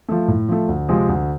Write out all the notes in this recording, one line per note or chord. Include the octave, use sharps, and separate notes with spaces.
F3 A3
A2
F3 A3
D2
C3 F3 G#3 C4
D2